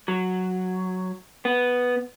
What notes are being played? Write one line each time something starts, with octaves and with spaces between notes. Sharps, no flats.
F#3
B3